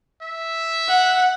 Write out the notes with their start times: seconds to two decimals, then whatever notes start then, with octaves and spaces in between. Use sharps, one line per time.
0.22 E5
0.88 F#5